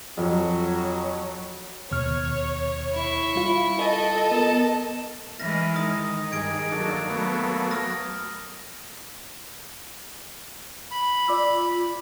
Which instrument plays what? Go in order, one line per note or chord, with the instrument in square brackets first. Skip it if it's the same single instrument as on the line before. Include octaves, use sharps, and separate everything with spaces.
[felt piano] F2 [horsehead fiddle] F#3
[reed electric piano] D#2 B2 F6 [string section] C#5
[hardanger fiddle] E4 C#6
[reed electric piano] G3 F4
[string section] A4 D#5
[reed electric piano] B3 A#4 [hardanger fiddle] A5
[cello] E3 G#3 [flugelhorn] E4 [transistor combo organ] F6 [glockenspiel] A#6
[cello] D#3 [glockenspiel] D#6 A#6
[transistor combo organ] G2 [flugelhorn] G#4 [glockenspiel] G#6 D7
[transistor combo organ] F#3 D4 A4 [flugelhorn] A#3
[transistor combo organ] F#3 A3 B3
[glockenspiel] D#6 F6 A#6
[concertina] B5
[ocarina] F4 [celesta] D5 D6 E6